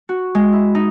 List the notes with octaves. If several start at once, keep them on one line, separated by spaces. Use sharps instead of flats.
F#4
G#3
E4
D#4